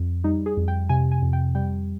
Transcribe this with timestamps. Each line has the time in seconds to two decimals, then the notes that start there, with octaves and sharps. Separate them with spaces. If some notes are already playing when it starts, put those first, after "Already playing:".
Already playing: F2
0.24 G3 D#4
0.46 G#4
0.57 F2
0.68 G5
0.89 C3 G#5
1.12 G#5
1.22 F2
1.33 G5
1.55 G3 G5